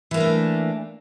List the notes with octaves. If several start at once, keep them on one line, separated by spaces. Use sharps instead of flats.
E3 A3 A#3 D4